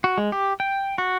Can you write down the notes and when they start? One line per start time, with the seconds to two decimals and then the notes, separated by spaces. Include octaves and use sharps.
0.04 F#4
0.18 G#3
0.32 G4
0.60 G5
0.98 F#4